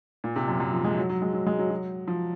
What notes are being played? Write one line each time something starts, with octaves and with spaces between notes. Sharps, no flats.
A#2
C3
F#2
F#2
F3
G#3
F#3
F#3
G#3
F#3
G#3
F#3
F#3
F3